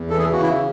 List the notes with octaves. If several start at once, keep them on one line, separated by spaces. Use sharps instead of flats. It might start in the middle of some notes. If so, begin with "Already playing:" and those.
Already playing: E2
E3 A4
G#4
C#3 F#4
E4